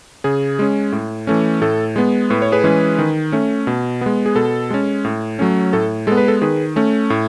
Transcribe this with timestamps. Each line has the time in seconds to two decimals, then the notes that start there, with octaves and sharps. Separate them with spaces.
0.24 C#3 G#4
0.59 G#3 C#4
0.92 A2
1.27 E3 A3 C#4
1.62 A2 A4
1.96 G#3 B3
2.30 A2 B4
2.42 C#5
2.52 G#4 B4
2.64 E3 G#3 C#4
2.99 D#3
3.32 A3 C#4
3.67 B2
4.01 G#3 B3
4.26 G#4
4.35 B2 A4
4.70 G#3 C#4
5.05 A2
5.39 F#3 A3 C#4
5.73 A2 A4
6.07 G#3 B3 A4
6.17 B4
6.28 A4
6.41 D#3 G#4 B4
6.76 A3 C#4
7.10 A2